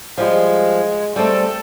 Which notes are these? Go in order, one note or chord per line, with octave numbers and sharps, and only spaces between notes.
F3 G3 G#3
G3 A3 C4 A4